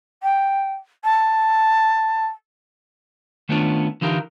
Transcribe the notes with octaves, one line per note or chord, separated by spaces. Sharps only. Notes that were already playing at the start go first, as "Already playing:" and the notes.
G5
A5
D#3 A3 B3 C#4 D4 F4
D3 E3 D#4 F4 G4 A#4